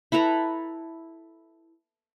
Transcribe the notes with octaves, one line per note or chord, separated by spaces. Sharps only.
E4 A4 B4 A#5